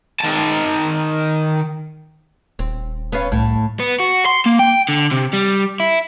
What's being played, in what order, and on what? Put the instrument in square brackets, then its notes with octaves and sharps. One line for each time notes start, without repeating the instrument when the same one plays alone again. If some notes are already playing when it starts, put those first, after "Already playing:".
[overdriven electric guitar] D#3 A5
[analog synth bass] D#1 [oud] C4
[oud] B3 C#4 F5
[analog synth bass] C2 [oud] A2
[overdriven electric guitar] B3
F#4
C6
A#3
G5
D3
C3
G3
E4